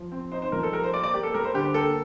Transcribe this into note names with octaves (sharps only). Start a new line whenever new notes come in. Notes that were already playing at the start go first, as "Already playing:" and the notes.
Already playing: F3
C4
D#4 C5
C5
F3 A#4
A4
G3 A#4
C5
A#3 D5
D5
A#3 G4
A4
G3 A#4
C5
D3 G4
A#3 A4